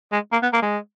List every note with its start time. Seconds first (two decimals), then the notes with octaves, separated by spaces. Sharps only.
0.12 G#3
0.33 A#3
0.43 B3
0.53 A#3
0.62 G#3